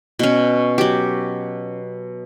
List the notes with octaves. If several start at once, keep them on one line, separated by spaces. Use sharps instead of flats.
B2 C#4
F#3 G4